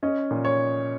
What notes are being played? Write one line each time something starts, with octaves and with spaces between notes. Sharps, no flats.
C#4 D#5
A#2
C#5